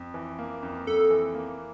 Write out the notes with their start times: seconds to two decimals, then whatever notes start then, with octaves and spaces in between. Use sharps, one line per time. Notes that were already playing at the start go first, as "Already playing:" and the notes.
Already playing: F2
0.14 E3
0.39 A#3
0.63 F2
0.86 F2 A4
1.11 E3
1.35 A#3